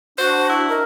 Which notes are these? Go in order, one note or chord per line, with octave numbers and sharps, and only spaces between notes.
D4 F#4 C5
E4
A#4 D#5